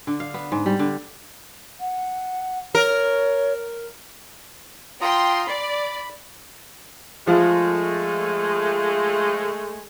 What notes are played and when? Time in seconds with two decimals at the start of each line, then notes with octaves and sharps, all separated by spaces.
0.07 D3
0.20 F5
0.34 B3
0.52 G#2
0.66 G3
0.79 D3
1.80 F#5
2.75 A#4 C#5
5.01 F4 G5 A#5 C6 D#6
5.47 D5 B5
7.27 F3 G#3 A3 F4